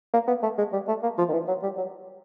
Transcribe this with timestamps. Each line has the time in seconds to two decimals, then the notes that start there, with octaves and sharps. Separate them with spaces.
0.13 A#3
0.28 B3
0.43 A3
0.58 G#3
0.73 G3
0.88 A3
1.03 A#3
1.18 F3
1.29 D#3
1.33 E3
1.48 F#3
1.63 G3
1.78 F#3